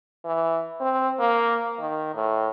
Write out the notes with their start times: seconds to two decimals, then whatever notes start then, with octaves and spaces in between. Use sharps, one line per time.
0.25 E3
0.80 C4
1.19 A#3
1.80 D#3
2.15 A2